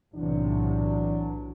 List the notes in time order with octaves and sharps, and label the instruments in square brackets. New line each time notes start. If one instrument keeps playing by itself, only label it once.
[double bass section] B1 A2 C3 [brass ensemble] E3 F#3 D4